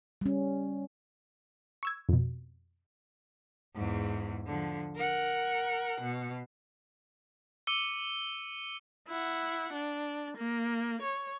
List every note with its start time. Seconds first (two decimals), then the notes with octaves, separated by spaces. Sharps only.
0.21 G3 C#4
1.83 C#6 E6 G#6
2.09 F2 B2
3.75 E2 G#2
4.46 D3 F3
4.96 A#4 F#5
6.01 B2
7.67 D6 E6 C#7 D#7 G7
9.08 E4 F#5
9.73 D4
10.37 A#3
11.02 C#5